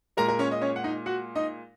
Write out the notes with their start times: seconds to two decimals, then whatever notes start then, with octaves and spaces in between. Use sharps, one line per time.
0.17 A#2 G#3 A#4 A#5
0.28 A#4
0.39 C#4 C#5
0.51 D#5
0.61 C#4 C#5
0.76 F#5
0.84 D#4 D#5
1.06 F#4 F#5
1.35 D#4 D#5